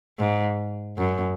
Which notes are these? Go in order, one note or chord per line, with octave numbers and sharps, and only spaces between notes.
G#2
F#2